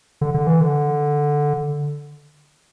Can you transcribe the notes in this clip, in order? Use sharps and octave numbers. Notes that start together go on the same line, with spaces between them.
D3
D3
E3
D3